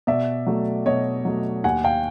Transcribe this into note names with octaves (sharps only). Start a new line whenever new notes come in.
B2 D5 E5
F#3 A3
B2 C#5 D#5
F#3 A3
D#2 F#5 G#5
F5 G5